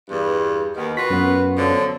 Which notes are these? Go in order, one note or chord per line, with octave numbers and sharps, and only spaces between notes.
E2 G2
D#2 D#3 B3
F4 F#4 B4 B6
F#2 B3
D3 F3 F#3